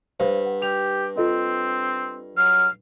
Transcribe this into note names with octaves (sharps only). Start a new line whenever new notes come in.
G2 C5 F5
F#5
G4 F7
C4 F4 A4 D#5
F#3 F6